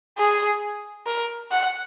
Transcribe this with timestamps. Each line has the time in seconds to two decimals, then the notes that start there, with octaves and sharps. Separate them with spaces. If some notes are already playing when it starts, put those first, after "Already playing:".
0.18 G#4
1.06 A#4
1.51 F#5